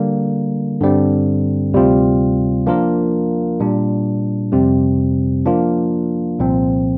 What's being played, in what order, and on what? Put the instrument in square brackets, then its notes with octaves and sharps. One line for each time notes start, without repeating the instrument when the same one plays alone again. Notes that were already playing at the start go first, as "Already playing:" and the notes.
Already playing: [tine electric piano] D3 G3 A#3
G2 D3 G3 C4
D2 C3 G3 C4 F4
F3 A#3 D4 F4 A#4
A#2 G3 D4
F2 C3 G3 C4
F3 A#3 D4 F4
C2 A#2 F3 C4